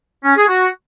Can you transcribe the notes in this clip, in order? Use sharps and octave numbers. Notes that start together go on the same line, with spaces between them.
C#4
G#4
F#4